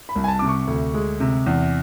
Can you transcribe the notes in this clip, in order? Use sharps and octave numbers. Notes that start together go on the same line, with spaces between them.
B5
C2
G#5
A5
C3 D6
C#6
D2
G#3
C3
E2